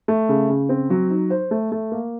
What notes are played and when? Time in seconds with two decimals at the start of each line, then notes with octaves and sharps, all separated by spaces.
0.08 A3
0.29 C#3
0.49 C#3
0.69 C4
0.90 F#3
1.10 D#4
1.30 C5
1.51 A3
1.72 A3
1.92 A#3